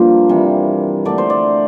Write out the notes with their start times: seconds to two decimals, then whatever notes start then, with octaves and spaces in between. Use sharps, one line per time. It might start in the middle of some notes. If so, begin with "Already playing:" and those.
Already playing: G2 F3 A#3 C5
0.29 C3 E3 G3
1.05 D3 A3 D5
1.18 C5
1.30 D5